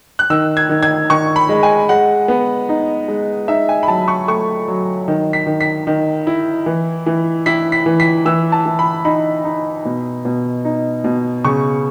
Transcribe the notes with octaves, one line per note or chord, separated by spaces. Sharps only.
F#6
D#3 E6
G#6
D#3
G#6
D#3 C#6
B5
G#3
G#5
G#3 F#5
B3
D#4
G#3
D#4 E5
G#5
B5
F#3 A5
C#6
A3 C#6
F#3
D#3
B6
D#3
B6
D#3
E4
E3
E3
E4 B6
B6
E3
B6
E3 E6
A5
E3
B5
D#4 B5
D#4
B2
B2
D#4
B2
C#3 C#6